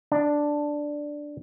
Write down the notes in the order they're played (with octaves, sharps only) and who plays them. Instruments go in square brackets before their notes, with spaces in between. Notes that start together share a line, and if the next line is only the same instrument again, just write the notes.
[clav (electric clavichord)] D4